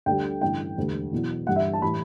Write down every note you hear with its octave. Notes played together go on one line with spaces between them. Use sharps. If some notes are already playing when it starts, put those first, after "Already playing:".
D2 D3 G3 G5
A1 G2 D3 G5
E1 D2 D3 G3
E2 B2 F#3
G1 G2 E3 G3 F#5
E5
A5
A2 E3 G3 B5